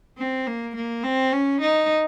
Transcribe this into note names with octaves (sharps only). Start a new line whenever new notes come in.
C4
A#3
A#3
C4
C#4
D#4